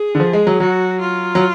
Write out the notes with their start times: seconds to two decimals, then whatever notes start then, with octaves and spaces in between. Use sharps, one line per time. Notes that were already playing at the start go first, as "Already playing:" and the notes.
Already playing: G#4
0.15 D3
0.20 F3
0.33 G#3
0.47 F#3
0.60 F#3 F#4
1.01 F4
1.35 F#3